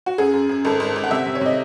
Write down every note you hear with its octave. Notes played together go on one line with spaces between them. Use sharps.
F#4
F#2 G#4
F#2
F#2
G#1 A4
G#1
G#1
F#5
C3 E5
C3
C#5
C3 D#5